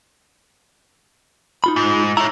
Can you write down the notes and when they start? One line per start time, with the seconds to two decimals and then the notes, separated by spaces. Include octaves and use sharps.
1.64 D#4 F4 B5
1.76 G#2
2.17 E4 C#5 A#5